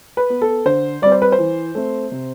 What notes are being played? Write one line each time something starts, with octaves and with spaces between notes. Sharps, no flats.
B4
B3
A4
D3 C5
G3 C4 D5
C5
B4
C5
E3
A3 C4
C3